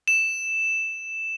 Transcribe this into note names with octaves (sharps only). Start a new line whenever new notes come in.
E7